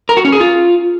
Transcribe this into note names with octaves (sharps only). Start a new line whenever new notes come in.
A#4
F#4
C#4
G#4
F4